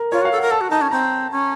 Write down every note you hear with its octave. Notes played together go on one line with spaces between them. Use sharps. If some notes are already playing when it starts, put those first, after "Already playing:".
Already playing: A#4
F4 C#5
F#4 F5
A4
F#5
A#4
A4 A5
F#4
D#4 A5
C#4
C4 A#5
C#4